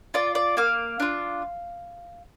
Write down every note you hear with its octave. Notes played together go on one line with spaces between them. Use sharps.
F4 D5
D5
A#3 F5
D4 F4